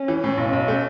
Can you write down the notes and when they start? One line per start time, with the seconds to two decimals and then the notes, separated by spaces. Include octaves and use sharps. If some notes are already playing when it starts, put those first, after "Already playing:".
Already playing: C#4
0.08 E3
0.24 A2
0.38 B1
0.53 B1
0.68 A3